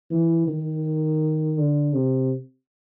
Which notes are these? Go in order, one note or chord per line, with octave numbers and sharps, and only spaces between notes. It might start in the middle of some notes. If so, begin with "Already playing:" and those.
E3
D#3
D3
C3